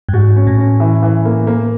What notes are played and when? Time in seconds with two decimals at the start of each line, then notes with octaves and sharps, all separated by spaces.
0.09 G2
0.14 G#2 F#4
0.36 C#4
0.47 A2
0.57 C#4
0.80 E3
1.03 E3
1.25 A#3
1.47 A#3